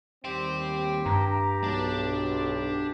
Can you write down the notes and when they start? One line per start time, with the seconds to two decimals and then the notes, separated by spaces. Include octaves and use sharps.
0.25 D#2 G3 C4 G4 G5 C6
1.06 G2 A#5
1.64 B1 D4